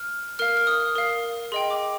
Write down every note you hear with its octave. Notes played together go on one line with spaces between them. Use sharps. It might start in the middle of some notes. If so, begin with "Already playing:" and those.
Already playing: F6
A#4 F5 F6
F6
D#6
A#4 F5
G#4 D#5 G5 C6
D6